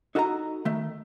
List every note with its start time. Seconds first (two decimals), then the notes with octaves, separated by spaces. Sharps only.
0.15 D#4 F#4 A4 D#5 F5 A#5
0.65 D#3 A3